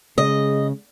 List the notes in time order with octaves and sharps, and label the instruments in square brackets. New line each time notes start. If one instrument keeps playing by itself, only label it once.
[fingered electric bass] C#3 [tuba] G#3 [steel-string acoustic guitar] D#5